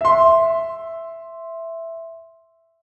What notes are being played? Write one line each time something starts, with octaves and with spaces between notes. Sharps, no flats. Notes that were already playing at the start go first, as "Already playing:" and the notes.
E5 C6